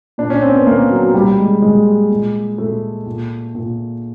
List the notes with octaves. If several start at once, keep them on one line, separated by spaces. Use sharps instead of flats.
A#2 D4
C#4
C4
B3
A#2 A#3
F#3
A#2 G3
G#3
A#2 G#3
A#2
A#2 A3
A#2
A#2